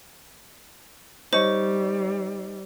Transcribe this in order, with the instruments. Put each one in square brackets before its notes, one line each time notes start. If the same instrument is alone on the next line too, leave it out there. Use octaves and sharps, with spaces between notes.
[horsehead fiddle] G3 [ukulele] D#4 C#5 [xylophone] C5